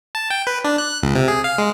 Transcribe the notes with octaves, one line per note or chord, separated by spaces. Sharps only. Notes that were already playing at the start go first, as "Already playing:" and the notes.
A5
G5
B4
D4
F#6
F#6
C#2
C3
G#4
F5
G#3